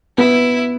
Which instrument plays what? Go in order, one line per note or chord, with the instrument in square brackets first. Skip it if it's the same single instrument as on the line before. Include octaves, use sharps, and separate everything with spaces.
[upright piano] B3 [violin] E4